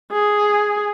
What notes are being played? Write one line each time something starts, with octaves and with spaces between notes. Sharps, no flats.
G#4